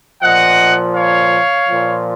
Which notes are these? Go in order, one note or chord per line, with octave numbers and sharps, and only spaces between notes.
A#2 F3 D#5 F#5
C#5 F5
A#2 F3